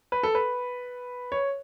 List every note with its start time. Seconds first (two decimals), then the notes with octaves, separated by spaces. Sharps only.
0.12 B4
0.23 A4
0.35 B4
1.32 C#5